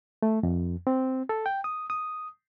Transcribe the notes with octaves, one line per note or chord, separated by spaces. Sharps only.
A3
F2
C4
A4
G5
D#6
D#6